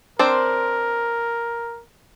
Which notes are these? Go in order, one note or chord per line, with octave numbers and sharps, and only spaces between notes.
C4 D4 A#4 C5